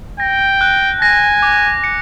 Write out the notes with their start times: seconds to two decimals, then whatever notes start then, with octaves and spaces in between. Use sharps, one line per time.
0.20 G5 A#6
0.61 F#6
1.01 G#5 A#6
1.43 D6
1.84 C#7